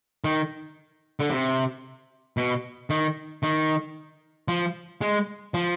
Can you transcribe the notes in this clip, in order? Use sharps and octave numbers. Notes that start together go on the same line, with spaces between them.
D#3
D3
C3
B2
D#3
D#3
F3
G#3
F3